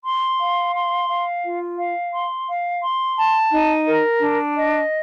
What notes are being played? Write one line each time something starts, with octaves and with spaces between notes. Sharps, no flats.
C6
F5
C6
F5
F4
F5
C6
F5
C6
A5
D#4
A#4
D4
D#5